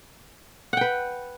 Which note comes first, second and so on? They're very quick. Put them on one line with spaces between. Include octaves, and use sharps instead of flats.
F#5 G5 B4